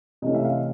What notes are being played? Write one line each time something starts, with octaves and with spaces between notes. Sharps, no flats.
C3 E3 A3 C#4 D#5
E5
F5